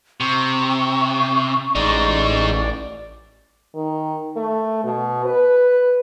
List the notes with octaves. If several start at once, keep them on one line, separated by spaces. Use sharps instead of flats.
C3 C#6
A1 G#3 D#4 D5
D#3
A3
B2
B4